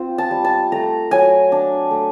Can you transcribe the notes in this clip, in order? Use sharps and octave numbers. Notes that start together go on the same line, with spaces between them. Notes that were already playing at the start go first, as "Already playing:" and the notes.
Already playing: C4 F4
A5
G3
A5
A3 A#5
F#3 G#5
D4
A3